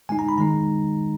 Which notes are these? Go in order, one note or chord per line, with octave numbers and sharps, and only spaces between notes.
D3 G#3 D#4 G#5
A#5
B5
D#3 G#3 D#4 A#5